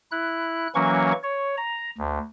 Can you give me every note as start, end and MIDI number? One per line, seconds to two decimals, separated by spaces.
0.11 0.68 64
0.11 0.68 90
0.75 1.12 52
0.75 1.12 54
0.75 1.12 58
0.75 1.12 61
0.75 1.12 85
1.23 1.55 73
1.57 1.90 82
1.98 2.19 38